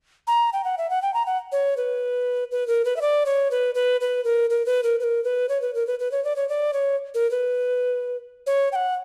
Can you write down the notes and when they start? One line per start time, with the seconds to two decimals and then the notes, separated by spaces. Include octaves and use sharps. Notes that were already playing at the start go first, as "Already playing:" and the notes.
0.27 A#5
0.53 G5
0.64 F#5
0.78 E5
0.90 F#5
1.02 G5
1.14 A#5
1.26 F#5
1.52 C#5
1.77 B4
2.51 B4
2.68 A#4
2.85 B4
2.96 E5
3.01 D5
3.26 C#5
3.51 B4
3.75 B4
4.01 B4
4.25 A#4
4.50 A#4
4.66 B4
4.84 A#4
5.00 B4
5.04 A#4
5.24 B4
5.49 C#5
5.62 B4
5.75 A#4
5.87 B4
5.99 B4
6.12 C#5
6.24 D5
6.36 C#5
6.49 D5
6.73 C#5
7.14 A#4
7.31 B4
8.47 C#5
8.72 G5
8.76 F#5